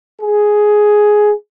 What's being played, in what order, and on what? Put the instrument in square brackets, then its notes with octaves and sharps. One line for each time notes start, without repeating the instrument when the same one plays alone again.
[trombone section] G#4